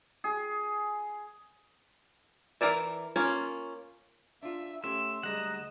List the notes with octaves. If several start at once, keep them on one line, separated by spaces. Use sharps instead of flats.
G#4
E3 A#4 D5 E5
A#3 C#4 F4
D4 F4 E5
A3 C#4 G4 E5 C6 E7
D2 G3 G#3 D#5 F#5 A#5